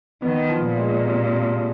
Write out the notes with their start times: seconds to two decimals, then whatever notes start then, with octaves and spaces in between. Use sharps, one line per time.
0.22 D#3 B3
0.49 F3
0.64 A#2
0.77 G#3
1.04 C3
1.32 C3